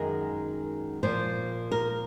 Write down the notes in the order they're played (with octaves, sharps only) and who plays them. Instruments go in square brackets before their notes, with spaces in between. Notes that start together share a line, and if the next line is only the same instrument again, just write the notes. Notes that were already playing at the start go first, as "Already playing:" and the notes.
Already playing: [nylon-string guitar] F#2 D#3 G#3 A#4
A#2 F3 A#3 C5
A#4